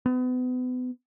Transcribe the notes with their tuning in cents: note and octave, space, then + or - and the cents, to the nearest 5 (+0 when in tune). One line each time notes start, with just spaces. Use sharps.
B3 +35